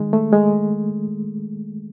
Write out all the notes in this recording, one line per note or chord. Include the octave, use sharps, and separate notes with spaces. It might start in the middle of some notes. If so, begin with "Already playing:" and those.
Already playing: D#3 G#3
A3
G#3